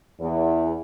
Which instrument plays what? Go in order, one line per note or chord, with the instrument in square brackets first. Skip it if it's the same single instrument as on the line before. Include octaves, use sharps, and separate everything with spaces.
[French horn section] E2